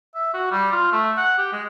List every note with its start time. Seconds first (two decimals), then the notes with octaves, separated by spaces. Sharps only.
0.15 E5
0.34 F#4
0.51 G3
0.72 F4
0.92 A3
1.17 F#5
1.38 G4
1.53 G#3